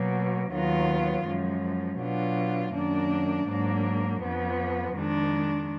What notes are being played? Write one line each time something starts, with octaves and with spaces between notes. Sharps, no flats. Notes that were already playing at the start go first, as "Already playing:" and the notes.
Already playing: B2 F#3 A#3
D#2 D#3 F#3 B3 F4
F#2 F3 G#3
B2 F#3 D4 F4
F#2 D#3 A#3 D4
G#2 F#3 A#3 D4
F2 F3 B3
F2 D#3 G#3 D4